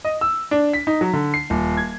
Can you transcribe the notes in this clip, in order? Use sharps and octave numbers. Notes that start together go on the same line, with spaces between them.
D#5
E6
D4
B6
D#4
F#3
D3
C7
D#1
G#6